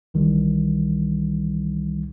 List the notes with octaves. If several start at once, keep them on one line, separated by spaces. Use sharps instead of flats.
C2 D#3 E3 G3